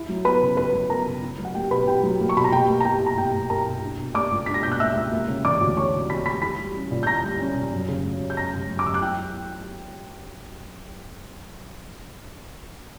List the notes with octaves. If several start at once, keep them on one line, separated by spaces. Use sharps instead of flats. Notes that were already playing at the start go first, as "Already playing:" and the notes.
Already playing: E4
F#3
B3 B4 B5
C#3
E4 B4 B5
F#3
B3 A#4 A#5
C#3
E4
F#3
F#5
A#3 G4 G5
B2 B4 B5
E4 G4 G5
F#3
A#3
C#6
B2 B5
A#5
B2 G4 G5
A#3
A#5
E4 G4 G5
B2
A#5
B2 G4 G5
A#3
E4 A#4 A#5
B2
D4
B2
A#3 D5 D6
C#2
D4 B6
A#6
B2 G6
F#6
A#3 E5 E6
C#2
A#3
C#3
E3 D5 D6
D2
A#3 C#5 C#6
C#3
E3 B5 B6
D2 B5 B6
E4 B5 B6
G3
C#4
A#2
G6
E4 A#5 A#6
G3
C#4
A#2
F#2
C#3
F#3
F#2
G6
F#2 A#5 A#6
C#3
F#3
D6
F#2 E6
F#6
E4 G5 G6